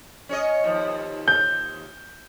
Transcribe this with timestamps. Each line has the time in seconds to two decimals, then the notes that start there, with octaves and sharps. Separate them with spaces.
0.29 C#4 C#5 D#5
0.64 D#2 F3
1.28 G6